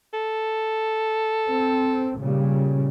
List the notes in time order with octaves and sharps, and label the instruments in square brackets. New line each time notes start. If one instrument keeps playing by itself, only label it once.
[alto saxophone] A4
[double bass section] C4
A#2 C#3 G3